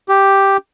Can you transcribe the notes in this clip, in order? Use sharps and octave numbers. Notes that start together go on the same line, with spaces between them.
G4